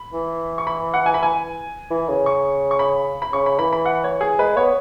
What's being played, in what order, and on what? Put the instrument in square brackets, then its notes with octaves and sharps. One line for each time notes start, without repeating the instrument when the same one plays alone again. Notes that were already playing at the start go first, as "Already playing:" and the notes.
Already playing: [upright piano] B5
[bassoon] E3
[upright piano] C#6
B5
F#5
G#5
B5
G#5
[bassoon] E3
C#3
[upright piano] C#6
C#6
B5
B5
[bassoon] C#3 [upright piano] C#6
[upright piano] B5
[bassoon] E3 [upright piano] B5
[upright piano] B5
F#5
C#5
G#4
[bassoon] G#3 [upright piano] B4
[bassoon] B3 [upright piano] C#5